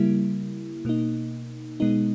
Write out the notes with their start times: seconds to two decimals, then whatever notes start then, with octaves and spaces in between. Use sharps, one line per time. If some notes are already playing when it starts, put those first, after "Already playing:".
Already playing: C#3 G3 A#3 E4
0.85 B2 A#3 D#4
1.80 B2 G#3 B3 D#4